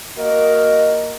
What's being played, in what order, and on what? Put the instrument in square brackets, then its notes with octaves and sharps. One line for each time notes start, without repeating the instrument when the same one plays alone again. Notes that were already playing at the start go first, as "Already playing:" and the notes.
[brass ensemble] A#3 F#4 A#4 D#5